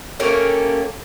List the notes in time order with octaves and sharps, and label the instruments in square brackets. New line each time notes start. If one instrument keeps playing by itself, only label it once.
[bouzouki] A3 A#3 C#4 G4